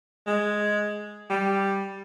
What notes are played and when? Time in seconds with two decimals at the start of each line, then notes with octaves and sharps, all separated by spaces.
0.27 G#3
1.30 G3